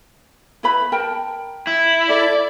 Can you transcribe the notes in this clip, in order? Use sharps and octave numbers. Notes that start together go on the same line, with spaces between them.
E4 B4 B5
A#4 G5 A5
E4
A4 D5